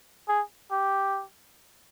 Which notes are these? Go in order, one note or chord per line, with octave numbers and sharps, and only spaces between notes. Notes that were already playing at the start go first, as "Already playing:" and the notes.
G#4
G4